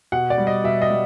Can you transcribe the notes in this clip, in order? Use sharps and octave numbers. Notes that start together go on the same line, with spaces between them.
B2 F#5
D5
G3
D#5
B2 E5
D#5
G3